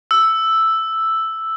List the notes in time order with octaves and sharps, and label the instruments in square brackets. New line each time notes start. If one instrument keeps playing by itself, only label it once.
[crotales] E6